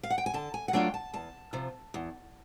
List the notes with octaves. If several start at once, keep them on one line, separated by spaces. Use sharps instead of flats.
F5
F#5
G5
G#5
D3 A5
G#5
F#5
F#3 A3 D4 F4 G5
A5
E2 A5
C3 F3
E2